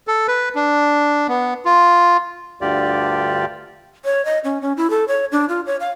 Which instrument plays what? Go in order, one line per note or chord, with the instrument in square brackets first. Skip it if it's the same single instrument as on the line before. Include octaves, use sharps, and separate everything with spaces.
[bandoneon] A4
B4
D4
B3
F4
D2 G2 D3 F4 G4 D5
[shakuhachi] C#5
D#5
C#4
C#4
E4
A4
C#5
D4
F4
C#5
F5